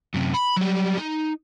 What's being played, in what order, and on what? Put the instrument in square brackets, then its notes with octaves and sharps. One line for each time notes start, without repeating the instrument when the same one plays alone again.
[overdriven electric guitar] F#2 C3
B5
F#3 G3
D#4